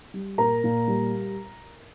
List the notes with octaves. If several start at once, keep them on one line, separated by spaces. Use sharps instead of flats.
G3
A#2 A#4 A#5
A#2
G3